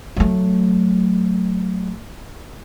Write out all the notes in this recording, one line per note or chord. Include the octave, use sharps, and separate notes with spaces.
F#3 A3